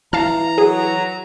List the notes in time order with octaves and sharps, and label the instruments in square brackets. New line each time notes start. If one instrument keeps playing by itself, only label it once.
[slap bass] E3 [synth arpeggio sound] F5 A5 F6 [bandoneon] A#5
[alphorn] F#3 [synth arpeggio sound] G#4